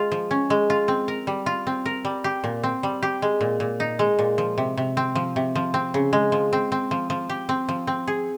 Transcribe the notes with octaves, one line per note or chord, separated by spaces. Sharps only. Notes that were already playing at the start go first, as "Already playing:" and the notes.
Already playing: G#3 F4
F3
C#4
G#3
F4
C4
A#4
G3
F4
C4
A#4
G3
G4
A#2
C4
G3
G4
G#3
A#2
A#2
D#4
G#3
A#2
F3
C3
C3
C4
F3
C3
F3
C4
C#3
G#3
F3
C4
C4
F3
F3
G4
C4
F3
C4
G#4